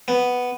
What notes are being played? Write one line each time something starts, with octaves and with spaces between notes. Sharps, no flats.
B3